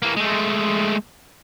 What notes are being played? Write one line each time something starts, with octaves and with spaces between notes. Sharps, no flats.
E3 A#3
G#3 A3